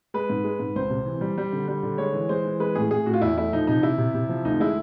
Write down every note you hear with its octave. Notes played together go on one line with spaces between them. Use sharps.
G#3 B4
G#2
G#3
G#2
C#2 C5
C3
E3
G3
G3
D3
G3
D3
G#3 C#5
E3
G#3 C5
E3
G#3 B4
A2 G#4
A2 G#4
A2 F#4
F4
E2 E4
A3 E4
F3 D#4
C3 D#4
C3 E4
C3
C3
F3
D2 D#4
G#3 E4